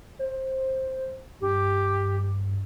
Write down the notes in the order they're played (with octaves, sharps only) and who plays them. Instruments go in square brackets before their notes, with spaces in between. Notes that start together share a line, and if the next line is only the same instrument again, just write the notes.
[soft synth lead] C5
[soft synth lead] G2 [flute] G4